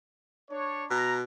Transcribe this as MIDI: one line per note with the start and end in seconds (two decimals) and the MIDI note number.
0.51 0.85 62
0.51 0.85 73
0.91 1.22 47
0.91 1.16 82